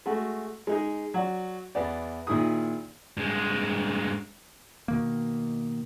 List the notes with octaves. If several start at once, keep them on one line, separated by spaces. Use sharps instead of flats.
G#3 A3 F#4
G#3 D#4 G#4
F#3 F#4 D5
E2 B3 D5
A#2 D#3 E4 G#4 D#6
G2 G#3
B2 D#3 A#3